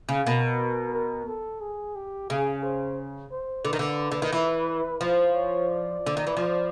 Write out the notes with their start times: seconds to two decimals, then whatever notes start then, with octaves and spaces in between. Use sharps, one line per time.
0.09 C#3
0.26 B2 A#4
0.94 A#4
1.28 A4
1.61 G#4
1.96 G4
2.30 C#3 G#4
2.63 C5
3.31 C5
3.65 D3 B4
3.73 D#3
3.79 D3
4.11 D3
4.22 D#3
4.32 E3
5.01 F3 C5
5.35 C#5
5.69 D5
6.06 D3
6.17 D#3
6.27 E3
6.37 F3